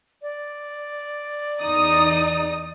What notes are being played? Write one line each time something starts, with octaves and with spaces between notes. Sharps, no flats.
D5
E2 D#4 D#6